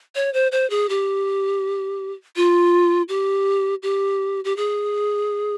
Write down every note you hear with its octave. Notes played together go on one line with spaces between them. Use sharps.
C#5
C5
C5
G#4
G4
F4
G4
G4
G4
G#4